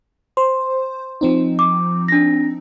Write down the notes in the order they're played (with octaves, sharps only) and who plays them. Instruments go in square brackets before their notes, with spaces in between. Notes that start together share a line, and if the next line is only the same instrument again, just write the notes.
[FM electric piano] C5 [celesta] C6
[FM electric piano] F3 C4 D#4
[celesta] D6
D4 A#6